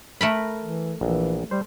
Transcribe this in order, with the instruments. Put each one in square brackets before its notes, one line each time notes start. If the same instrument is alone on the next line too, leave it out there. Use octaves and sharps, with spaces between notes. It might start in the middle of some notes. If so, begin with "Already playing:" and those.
[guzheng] A3 A#4 B5
[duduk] E3
[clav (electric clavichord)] A#1 [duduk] E3
[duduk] G3 [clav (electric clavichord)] C5